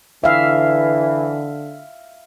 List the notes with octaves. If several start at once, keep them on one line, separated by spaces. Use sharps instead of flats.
D3 E3 E5 F5